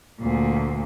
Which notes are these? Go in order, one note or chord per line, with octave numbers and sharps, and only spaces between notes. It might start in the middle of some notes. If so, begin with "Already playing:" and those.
D2 A#2